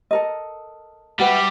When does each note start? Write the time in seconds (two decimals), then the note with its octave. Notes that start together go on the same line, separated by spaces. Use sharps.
0.11 A4 A#4 D#5
1.19 G3 F#4 B4 E5